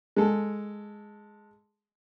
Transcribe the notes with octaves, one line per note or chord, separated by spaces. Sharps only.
G#3 A4